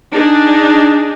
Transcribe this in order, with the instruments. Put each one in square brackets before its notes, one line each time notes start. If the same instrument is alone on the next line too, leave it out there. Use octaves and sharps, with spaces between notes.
[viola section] D4 D#4 G#4